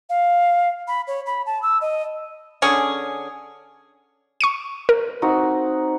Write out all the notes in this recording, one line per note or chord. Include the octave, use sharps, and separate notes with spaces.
F5
B5
C#5
B5
A5
E6
D#5
D3 C#4 G#4
C#6 C#7 D#7
A#4
C4 D#4 F#4